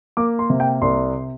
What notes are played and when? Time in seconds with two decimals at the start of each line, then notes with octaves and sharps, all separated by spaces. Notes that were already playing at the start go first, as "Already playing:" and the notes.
0.17 A#3 D6
0.39 C6
0.50 C3
0.60 G5
0.82 C2 C6